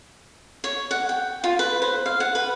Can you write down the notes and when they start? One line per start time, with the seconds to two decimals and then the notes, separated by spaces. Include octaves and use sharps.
0.64 C#5
0.91 F#5
1.09 G5
1.44 F4
1.59 B4
1.82 C5
2.06 F5
2.20 F#5
2.35 B4